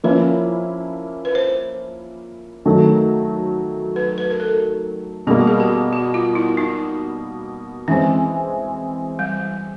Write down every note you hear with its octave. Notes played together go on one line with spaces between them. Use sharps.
F3 A#3 C#4 E4 B4
B4
C5
D#3 F#3 A3
B4
B4
A#4
A4
B2 G3 A#3 G#4
G#4
G4
F#4
F4
E4
D#4
E3 G#3 C4 C#4
G3